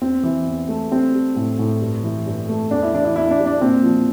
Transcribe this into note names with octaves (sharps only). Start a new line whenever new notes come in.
E2 C4
E3
E2
A3
G3 C4
G3
A2
A2
G2
E3
G2
A3
E2 D4
E4
E3 D4
E4
E2 E4
D4
G3
D4
A#2 C4
F3